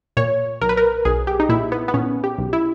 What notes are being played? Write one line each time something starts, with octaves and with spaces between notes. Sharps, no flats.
A#2 C#5
B1 A#4
B4
A#4
B1 G#4
G4
D#4
A#2 E4
B3
B3
A#2 C#4
G4
B1
E4